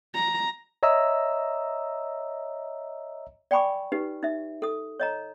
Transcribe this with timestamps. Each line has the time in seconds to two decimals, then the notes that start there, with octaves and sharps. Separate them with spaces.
0.15 A#5
0.83 C#5 D#5 E5 A#5 E6
3.51 D5 G5 G#5 B5 C#6 D6
3.92 D#4 G4 B4
4.23 D#4 E5
4.62 A4 D#6
5.00 C#5 D#5 A#5